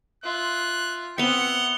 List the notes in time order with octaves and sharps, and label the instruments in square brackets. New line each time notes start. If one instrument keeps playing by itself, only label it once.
[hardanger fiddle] F4 E5 [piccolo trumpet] F#6
[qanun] B3 E5 [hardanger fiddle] C4 [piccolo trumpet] F#5 [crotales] C#7 F7 G7